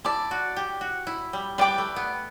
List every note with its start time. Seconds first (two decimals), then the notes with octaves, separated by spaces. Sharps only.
0.04 E4 D5 A5 D6
0.31 F#4
0.56 G4
0.81 F#4
1.07 E4
1.33 G3
1.58 G3 B4 D5 G5 D6
1.78 A3
1.96 B3